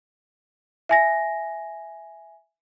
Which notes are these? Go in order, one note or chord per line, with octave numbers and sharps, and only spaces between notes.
E5 G#5 A#6